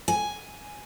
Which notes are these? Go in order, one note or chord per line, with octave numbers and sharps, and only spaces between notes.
G#5